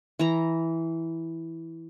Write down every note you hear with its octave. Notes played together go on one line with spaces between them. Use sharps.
E3 A#5